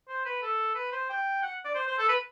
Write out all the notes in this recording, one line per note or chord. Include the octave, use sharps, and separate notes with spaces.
C5
B4
A4
B4
C5
G5
F#5
D5
C5
C5
A4
B4